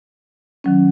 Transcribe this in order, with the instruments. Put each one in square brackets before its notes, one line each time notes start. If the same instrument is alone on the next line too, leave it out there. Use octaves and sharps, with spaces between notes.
[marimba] D#3 F#3 C#4